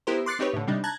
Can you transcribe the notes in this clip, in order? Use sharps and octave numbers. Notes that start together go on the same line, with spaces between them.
B3 E4 G4 A#4 C5
C6 D6 F#6 A6 C7 C#7
C4 D#4 G4 B4 C#5
A2 D3
C3 G3 D4 D#4
A5 A#5 F#6 G#6